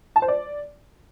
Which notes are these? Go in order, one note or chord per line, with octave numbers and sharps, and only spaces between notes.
A5
C5
D5